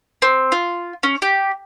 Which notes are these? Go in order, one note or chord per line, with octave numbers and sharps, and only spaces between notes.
C4
F4
C#4
G4